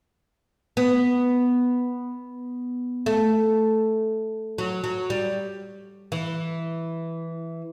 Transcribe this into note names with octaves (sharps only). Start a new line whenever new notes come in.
B3
A3
F#3
F#3
G3
E3